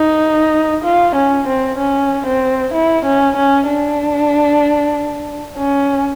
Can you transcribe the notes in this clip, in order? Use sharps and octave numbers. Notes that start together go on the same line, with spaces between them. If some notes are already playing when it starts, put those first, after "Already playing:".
Already playing: D#4
F4
C#4
C4
C#4
C4
E4
C#4
C#4
D4
C#4